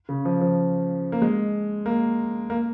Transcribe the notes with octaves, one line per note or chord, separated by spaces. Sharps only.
C#3
F3
F3
A#3
G#3
A#3
A#3